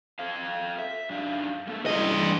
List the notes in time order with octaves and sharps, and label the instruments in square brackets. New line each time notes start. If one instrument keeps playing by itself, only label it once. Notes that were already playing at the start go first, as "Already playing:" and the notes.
[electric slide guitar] A4 C5 F5
E5
F#2 D4 F5
A3 A#3 A4
[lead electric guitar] G2 D#5 [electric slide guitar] C3 C#4 E4
[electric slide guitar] E3